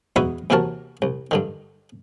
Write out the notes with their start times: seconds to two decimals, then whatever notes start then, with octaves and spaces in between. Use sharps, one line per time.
0.16 E2 D#4 E4 F#4 B4 D#6
0.50 D#2 C3 E3 F#4 A#4 A5
1.02 C2
1.31 G2 D3 D#3